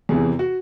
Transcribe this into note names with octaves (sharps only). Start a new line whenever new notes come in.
E2 C3 E3 G#4
F#4